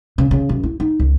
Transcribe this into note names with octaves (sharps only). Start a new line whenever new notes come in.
C#3
C#3
F#2
E4
D#4
C#2